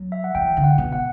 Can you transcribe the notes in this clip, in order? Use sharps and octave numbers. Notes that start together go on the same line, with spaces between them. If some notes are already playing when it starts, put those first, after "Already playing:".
Already playing: F#3
E5
F#5
E3 G5
D3
F#5
B2
F#5